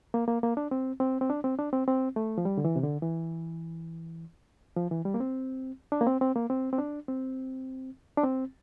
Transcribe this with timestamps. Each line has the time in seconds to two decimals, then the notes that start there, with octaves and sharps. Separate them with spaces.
0.14 A#3
0.28 A#3
0.43 A#3
0.57 D4
0.71 C4
1.00 C4
1.21 C4
1.30 D4
1.44 C4
1.59 D4
1.73 C4
1.88 C4
2.16 A3
2.38 F3
2.45 G3
2.58 D3
2.65 E3
2.76 C3
2.84 D3
3.02 E3
4.77 F3
4.91 E3
5.05 G3
5.14 A#3
5.20 C4
5.92 D4
6.01 A#3
6.07 C4
6.21 C4
6.36 A#3
6.50 C4
6.73 C4
6.78 D4
7.08 C4
8.17 D4
8.23 C4